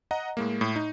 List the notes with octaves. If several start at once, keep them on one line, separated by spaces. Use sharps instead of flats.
D#5 F#5 A#5
A2 G#3 A#3
A2
D#4